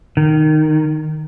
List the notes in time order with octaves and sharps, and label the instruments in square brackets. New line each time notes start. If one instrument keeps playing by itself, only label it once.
[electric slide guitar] D#3